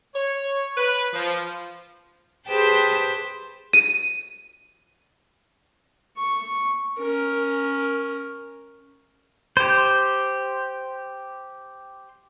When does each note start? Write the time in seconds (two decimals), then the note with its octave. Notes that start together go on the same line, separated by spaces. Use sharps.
0.14 C#5
0.77 B4
1.13 F3
2.48 G4 G#4 B4 C5 G5 A5
3.73 D#7
6.17 C#6
6.99 C#4 A#4
9.57 G4 C5